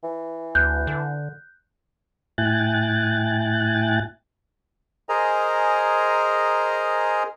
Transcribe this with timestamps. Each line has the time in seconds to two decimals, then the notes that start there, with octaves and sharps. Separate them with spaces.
0.03 E3
0.55 D2 F#6 G6
0.87 D3
2.38 A2 E4 G5 G#5 F#6 A6
5.09 G#4 A#4 C5 D#5 G#5 A#5